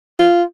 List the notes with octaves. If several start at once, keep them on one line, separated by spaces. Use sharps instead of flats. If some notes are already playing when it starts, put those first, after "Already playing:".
F4